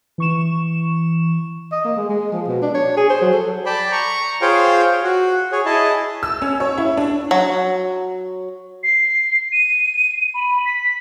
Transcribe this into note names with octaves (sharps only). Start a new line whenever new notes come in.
E3 C#6 E7
D#5
A#3
G#3
G#3
F3
B2
D4
C#5
G#4
C5
F#3
A4
D5 G5 A5 B5
A#5 C#6
F4 G#4 C5 C#5 F5 G5
F#4
G#4 C#5
E4 G#4 D#5 A5
E6
C#4
C#5
E4
D4
F#3
C7
D#7
B5
B6